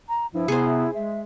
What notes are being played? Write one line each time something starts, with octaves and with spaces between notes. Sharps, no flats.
A#5
G2 F3 E4
C3 B3 G#4 C5
G#3 E5